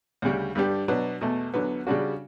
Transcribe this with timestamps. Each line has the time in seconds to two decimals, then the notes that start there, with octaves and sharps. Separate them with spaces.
0.22 D2 C#3 G3
0.55 G2 D3 G3 D4 G4
0.88 B2 F#3 B3 D4
1.21 E2 B2 A3
1.54 E2 D3 F#3 B3
1.87 C#3 G3 D4 F#4